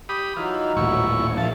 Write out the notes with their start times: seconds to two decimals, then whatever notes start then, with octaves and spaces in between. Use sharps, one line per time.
0.09 G4 B5 D#6
0.37 E3 F#3 D#4 F4
0.77 D#1 A1 E4 C#6
1.38 A#1 E5 F5 A5